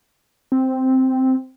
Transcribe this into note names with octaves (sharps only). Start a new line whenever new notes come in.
C4